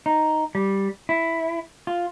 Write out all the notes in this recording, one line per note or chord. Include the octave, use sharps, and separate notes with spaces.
D#4
G3
E4
F4